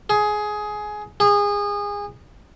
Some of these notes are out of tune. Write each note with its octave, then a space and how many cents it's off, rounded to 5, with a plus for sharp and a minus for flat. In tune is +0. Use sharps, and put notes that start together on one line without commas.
G#4 +15
G#4 -25